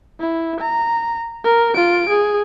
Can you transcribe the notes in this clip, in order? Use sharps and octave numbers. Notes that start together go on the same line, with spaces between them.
E4
A#5
A#4
F4 D7
G#4